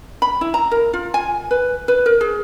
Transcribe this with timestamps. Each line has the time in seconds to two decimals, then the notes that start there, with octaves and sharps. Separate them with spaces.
0.22 B5
0.41 E4
0.54 A#5
0.71 A#4
0.93 F4
1.14 G#5
1.51 B4
1.88 B4
2.06 A#4
2.21 G#4